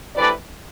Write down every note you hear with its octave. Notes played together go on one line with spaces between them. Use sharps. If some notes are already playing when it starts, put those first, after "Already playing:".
C3 E3 A3 D4 B4 D5